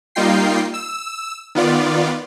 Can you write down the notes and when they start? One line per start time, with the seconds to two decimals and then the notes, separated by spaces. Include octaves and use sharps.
0.15 G3 A#3 D#4 F4 G5 C7
0.74 E6
1.55 D#3 B3 F4 D5